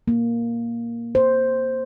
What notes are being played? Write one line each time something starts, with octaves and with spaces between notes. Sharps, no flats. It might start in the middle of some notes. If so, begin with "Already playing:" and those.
A#3
C5